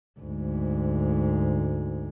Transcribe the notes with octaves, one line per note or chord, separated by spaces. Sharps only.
D2 G#2